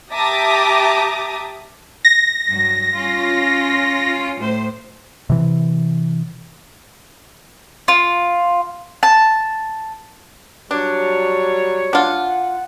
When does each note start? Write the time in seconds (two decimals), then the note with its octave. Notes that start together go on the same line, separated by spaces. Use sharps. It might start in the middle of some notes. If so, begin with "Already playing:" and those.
0.11 G4 E5 A5 A#5 D6 D#6
2.05 A#6
2.47 G2 F#3
2.94 C#4 F4
4.39 A2 C5
5.30 C3 E3
7.88 F4
9.03 A5
10.71 F#3 G3 D4 C#5
11.93 D4 F4 F#5